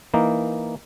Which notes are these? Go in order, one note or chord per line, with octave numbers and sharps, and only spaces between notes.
E3 A#3 D#4